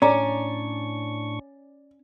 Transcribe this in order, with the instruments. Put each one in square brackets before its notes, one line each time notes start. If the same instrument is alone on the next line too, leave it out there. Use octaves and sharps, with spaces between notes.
[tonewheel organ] A2 D4 C#6 [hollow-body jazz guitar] C#4 [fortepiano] D5 [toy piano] A#5 D6